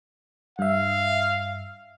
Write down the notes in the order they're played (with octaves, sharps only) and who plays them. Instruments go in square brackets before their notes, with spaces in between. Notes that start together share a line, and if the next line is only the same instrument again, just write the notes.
[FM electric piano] G2 E5 [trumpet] F5